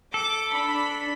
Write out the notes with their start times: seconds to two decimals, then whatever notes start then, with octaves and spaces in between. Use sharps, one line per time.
0.14 A4 D6
0.52 D4 B5 B6